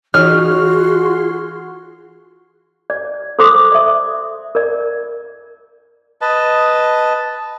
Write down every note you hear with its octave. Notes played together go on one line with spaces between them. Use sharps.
E3 D#4 F4 F#4 G#4 C#5 C6 F6
D5
A4 C5 C6 D6 D#6
D5 E5
A#4 D5
B4 D#5 A5